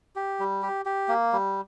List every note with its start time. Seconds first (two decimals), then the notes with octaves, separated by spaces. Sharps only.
0.16 G4
0.40 G3
0.62 G4
0.86 G4
1.08 A#3
1.33 G3